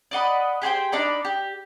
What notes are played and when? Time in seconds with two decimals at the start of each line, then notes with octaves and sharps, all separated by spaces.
0.11 D5 D#5 F#5 B5
0.62 G4 G#4 C5 G5
0.92 D4 D#4 D5 B5
1.25 G4